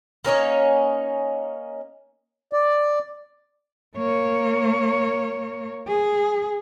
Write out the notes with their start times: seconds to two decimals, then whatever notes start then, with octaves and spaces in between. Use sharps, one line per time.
0.25 A#3 C#4 D#4 C#5
2.53 D5
3.96 A#3 C#5
5.87 G#4